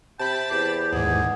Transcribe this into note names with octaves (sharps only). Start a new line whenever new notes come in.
C3 G5 A5 B5 A6
E2 G4 C5
D#2 G#2 G#4 F#5